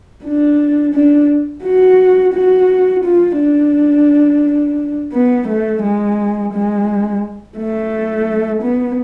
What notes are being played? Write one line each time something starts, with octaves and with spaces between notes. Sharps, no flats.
D4
D4
F#4
F#4
F4
D4
B3
A3
G#3
G#3
A3
B3